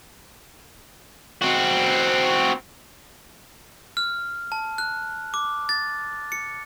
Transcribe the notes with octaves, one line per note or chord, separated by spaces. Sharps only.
C4 F#4
F6
A5
F#6
D6
A6
C#7